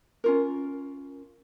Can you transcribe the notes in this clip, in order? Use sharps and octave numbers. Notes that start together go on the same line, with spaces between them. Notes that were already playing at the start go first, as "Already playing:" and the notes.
C#4 F4 A#4